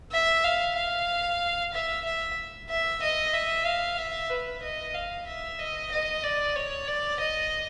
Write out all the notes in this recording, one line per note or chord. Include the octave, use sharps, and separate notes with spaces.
E5
F5
F5
E5
E5
E5
D#5
E5
F5
E5
B4
D#5
F5
E5
D#5
D#5
D5
C#5
D5
D#5